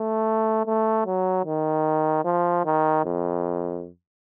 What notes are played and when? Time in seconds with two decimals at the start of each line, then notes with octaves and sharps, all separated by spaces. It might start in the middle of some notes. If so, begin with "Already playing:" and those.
Already playing: A3
0.66 A3
1.06 F#3
1.46 D#3
2.25 F3
2.65 D#3
3.05 F2